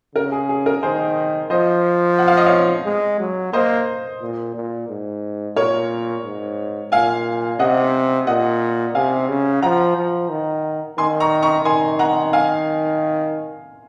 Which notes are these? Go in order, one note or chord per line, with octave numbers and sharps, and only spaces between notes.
C#3 A#4
G#4
G#4
A#4
D#3 G#4 C5
F3 C5 D#5
F#5
F5
D#5
C#5 F5
G#3
F#3
A#3 C5 D#5
A#2
A#2
G#2
A#2 A#4 C#5
G#2
A#2 F5 G#5
C3 D#5 F#5
A#2 D#5 F#5
C3 F5 G#5
C#3
F3 F#5 A#5
F3
D#3
D#3 G#5 C6
A#5 C#6
A#5 C#6
D#3 G#5 C6
F#5 A#5
F5 G#5